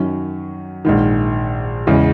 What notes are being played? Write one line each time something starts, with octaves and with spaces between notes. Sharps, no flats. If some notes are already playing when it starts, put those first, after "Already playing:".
Already playing: F#2 D#3 F#3 C#4
A#1 G#2 D#3
E2 C#3 G#3